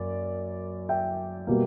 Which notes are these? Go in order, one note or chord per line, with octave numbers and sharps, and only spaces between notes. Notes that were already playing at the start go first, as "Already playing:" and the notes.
Already playing: F#2 A#3 D5
E5 G5
B2 G3 A#3